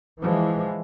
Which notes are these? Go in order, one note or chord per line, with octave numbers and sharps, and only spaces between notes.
E3 F3 G#3